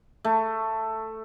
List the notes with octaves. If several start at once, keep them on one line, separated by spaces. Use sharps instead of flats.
A3